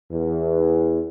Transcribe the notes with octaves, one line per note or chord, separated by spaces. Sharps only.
E2